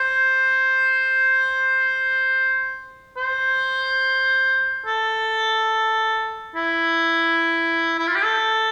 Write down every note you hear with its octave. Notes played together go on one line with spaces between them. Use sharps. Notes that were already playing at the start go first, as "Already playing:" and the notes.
Already playing: C5
C5
A4
E4
E4
F4
G4
A4